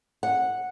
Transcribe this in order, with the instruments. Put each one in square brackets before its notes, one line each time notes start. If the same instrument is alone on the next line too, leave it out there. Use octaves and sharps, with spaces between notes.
[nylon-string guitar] F#5